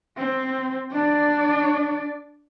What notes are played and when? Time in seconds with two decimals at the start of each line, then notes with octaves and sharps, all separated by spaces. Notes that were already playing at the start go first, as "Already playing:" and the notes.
0.18 C4
0.92 D4 D5